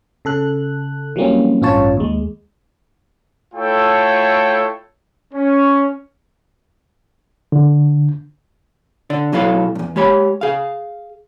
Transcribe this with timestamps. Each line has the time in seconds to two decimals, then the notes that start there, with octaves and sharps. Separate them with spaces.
0.25 C#3 A4 F#6
1.16 E3 F#3 G3 A#3 C4 C#4
1.61 A1 G2 C#4 F4 C#5 A5
1.97 D#2 G#3
3.54 A3 E4 F4 A4 C#5 G5
5.33 C#4
7.52 D3
9.10 D3 D5
9.32 B1 F#3 E4 F#4 A4 F5
9.75 E2 G2
9.96 G#3 G4 C#5 B5
10.41 G#4 F5